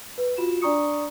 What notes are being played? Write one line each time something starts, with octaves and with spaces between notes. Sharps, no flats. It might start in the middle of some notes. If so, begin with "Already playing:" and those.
B4
F4 F#4 E7
D4 D5 A#5 C#6 D#6 C#7